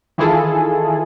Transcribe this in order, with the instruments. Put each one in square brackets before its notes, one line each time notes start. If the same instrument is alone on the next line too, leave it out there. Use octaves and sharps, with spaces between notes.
[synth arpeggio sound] D#3 E3 E4 F4 G#4 A4